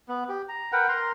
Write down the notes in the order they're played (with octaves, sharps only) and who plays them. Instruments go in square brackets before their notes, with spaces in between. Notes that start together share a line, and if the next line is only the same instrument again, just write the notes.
[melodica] B3
G4
A#5
A#4 B4 F#5 G5
A#4 A#5 C6